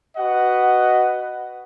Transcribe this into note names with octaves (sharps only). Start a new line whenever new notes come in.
F#4 B4 D#5 F#5